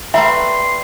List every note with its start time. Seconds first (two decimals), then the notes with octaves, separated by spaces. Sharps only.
0.14 G3 A3 B4 E5 A#5 C6